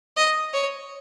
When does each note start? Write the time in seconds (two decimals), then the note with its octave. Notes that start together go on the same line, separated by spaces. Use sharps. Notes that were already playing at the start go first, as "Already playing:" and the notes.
0.17 D#5
0.53 C#5